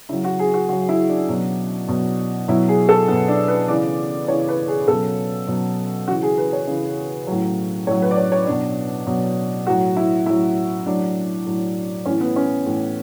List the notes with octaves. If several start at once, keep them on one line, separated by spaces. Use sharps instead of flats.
C#3 F#3 E4
F#4
G#4
F#4
C#3 F#3 F#4
E4
D4
B2 F#3
B2 F#3
B2 F#3 E4
G#4
A4
B2 F#3 B3
D4
B4
C#3 E3 D5
C#3 E3 C#5
B4
G#4
B2 F#3 A4
B2 F#3
C#3 E3 F#4
G#4
B4
C#5
C#3 E3
A2 F#3
A2 F#3 C#5
B4
D5
C#5
C#5
B2 F#3 D4
B2 F#3
A2 F#3 F#4
E4
A2 F#3 E4
A2 F#3 D4
A2 F#3
A2 E3 C#4
B3
C#4
A2 E3